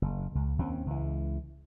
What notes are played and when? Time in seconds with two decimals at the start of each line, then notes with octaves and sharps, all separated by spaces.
0.02 F#1
0.35 C#2
0.58 D#2 C4 C#4
0.86 C#2 E3